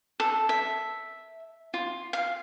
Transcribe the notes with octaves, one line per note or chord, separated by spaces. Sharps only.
A4
E5
F4
F5